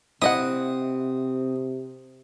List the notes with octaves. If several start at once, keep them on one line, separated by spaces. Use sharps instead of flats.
C3 C4 E4 D#5 F#5 D#6